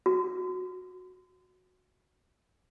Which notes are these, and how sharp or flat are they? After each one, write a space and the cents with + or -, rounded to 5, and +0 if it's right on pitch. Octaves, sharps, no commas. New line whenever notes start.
F#4 -15